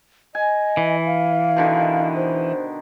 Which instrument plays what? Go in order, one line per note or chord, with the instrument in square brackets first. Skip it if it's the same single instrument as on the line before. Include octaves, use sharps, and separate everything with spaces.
[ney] D#5 [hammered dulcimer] G#5
[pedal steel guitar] E3
[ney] F5
[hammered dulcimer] B2 D3 D#3
[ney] C5